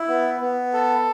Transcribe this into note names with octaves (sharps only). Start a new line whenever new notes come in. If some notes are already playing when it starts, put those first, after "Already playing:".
Already playing: E4
B3
B3
A4